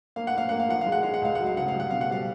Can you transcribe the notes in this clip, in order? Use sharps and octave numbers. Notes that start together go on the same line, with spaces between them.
A#3 F5
F#5
A#3 F5
A#3 F#5
F5
F3 F#5
F5
G#3
F#5
G#3 F5
F#5
C#2 F5
F#3 F#5
F5
C#3 F#5
F5
G3
F#5
B2 F5
F#5
G3 F5